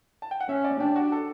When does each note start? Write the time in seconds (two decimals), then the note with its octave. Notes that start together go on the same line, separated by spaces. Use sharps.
0.22 A5
0.31 G5
0.41 F#5
0.49 C#4 E5
0.64 D5
0.80 D4 G4
0.96 F#4
1.12 A4